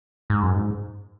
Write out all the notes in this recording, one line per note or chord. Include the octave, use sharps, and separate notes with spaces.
G#2
F#2
G#2